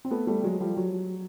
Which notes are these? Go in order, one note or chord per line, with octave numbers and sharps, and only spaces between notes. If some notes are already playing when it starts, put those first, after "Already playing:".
C4
A3 B3
G3 A3
F#3 G#3
F3 G3
F#3